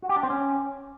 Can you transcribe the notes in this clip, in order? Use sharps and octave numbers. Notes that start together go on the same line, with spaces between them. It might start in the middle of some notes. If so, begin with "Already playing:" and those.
F#4
G4
D4
C4
C#4